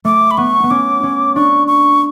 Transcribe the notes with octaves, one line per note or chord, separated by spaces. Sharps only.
A3 D6
B5
B3 C#6
B3
C#4 D6
C#4
D4 C#6
C#6